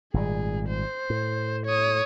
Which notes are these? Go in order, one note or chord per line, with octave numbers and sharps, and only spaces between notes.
G#1 A#2 G3 G#4
C5
A2
C#5 D#6